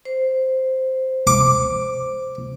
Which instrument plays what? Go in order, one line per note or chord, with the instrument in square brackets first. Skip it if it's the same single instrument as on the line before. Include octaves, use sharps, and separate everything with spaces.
[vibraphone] C5
[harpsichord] D6